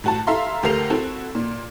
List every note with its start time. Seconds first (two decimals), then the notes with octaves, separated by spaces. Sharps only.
0.04 A2 F#4 A5
0.27 E4 A4 E5 F5 A#5 C6
0.63 D2 G4 A4 A#4 C7 F7
0.90 C4 E4 F#4 A4
1.35 A#2